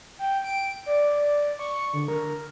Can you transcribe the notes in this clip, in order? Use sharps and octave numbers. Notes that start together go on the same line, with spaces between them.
G5
D7
D5
C#6
D3
A#4